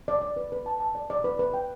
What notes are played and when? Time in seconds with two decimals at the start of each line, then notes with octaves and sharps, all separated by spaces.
0.08 D5
0.22 D5
0.36 B4
0.52 B4
0.66 A5
0.80 A5
0.95 D5
1.10 D5
1.24 B4
1.39 B4
1.54 G5